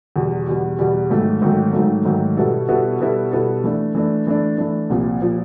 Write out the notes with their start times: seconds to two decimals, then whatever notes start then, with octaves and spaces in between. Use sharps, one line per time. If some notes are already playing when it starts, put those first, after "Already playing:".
0.16 E2 B2 G3
0.47 E2 B2 G3
0.79 E2 B2 G3
1.10 G#2 D#3 F#3 A3
1.42 G#2 D#3 F#3 A3
1.73 G#2 D#3 F#3 A3
2.05 G#2 D#3 F#3 A3
2.37 B2 G3 B3 E4 A4
2.68 B2 G3 B3 E4 A4
3.00 B2 G3 B3 E4 A4
3.31 B2 G3 B3 E4 A4
3.64 E3 A3 D4
3.95 E3 A3 D4
4.27 E3 A3 D4
4.58 E3 A3 D4
4.90 C2 A#2 F3
5.22 A#2 F3